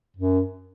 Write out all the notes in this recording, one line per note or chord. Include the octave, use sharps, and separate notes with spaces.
F#2